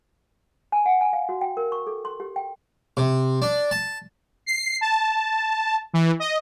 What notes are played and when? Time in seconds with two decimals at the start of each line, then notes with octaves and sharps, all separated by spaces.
0.72 G#5
0.86 F#5
1.01 G#5
1.13 F5
1.29 F#4
1.41 G5
1.57 A#4
1.72 C#6
1.87 A4
2.05 C6
2.20 G4
2.36 G5
2.97 C3
3.42 D4
3.71 A5
4.46 C7
4.81 A5
5.94 E3
6.19 D#5